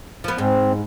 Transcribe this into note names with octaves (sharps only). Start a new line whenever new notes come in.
F3 B3
G#2 C4